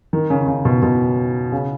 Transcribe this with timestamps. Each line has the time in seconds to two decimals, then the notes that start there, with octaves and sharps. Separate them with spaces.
0.13 D#3
0.30 C#3
0.47 C#3
0.65 B2
0.82 B2
1.52 C#3